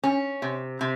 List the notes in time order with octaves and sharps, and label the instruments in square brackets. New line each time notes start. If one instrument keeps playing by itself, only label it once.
[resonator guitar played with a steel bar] C#4
C3
C3